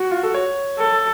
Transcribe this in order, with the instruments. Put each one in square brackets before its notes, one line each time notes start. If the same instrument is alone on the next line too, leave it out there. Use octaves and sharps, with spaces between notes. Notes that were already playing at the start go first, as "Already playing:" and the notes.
Already playing: [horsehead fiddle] F#4
[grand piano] F4
A4
C#5
[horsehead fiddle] A4